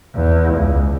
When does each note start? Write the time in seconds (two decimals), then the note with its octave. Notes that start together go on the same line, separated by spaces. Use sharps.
0.15 E2
0.55 C#2